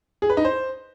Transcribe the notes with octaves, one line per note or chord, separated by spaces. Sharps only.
G#4
B4
D#4
C5